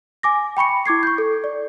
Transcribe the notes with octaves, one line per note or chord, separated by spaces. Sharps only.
G#5 D6 A#6
G5 B5 C#6 C#7
E4 D6 G#6 C7
C#6 G6
A4
D5